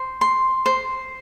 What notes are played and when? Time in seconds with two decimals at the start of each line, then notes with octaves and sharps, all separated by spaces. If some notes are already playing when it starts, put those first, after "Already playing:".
Already playing: C5
0.21 C6
0.66 C5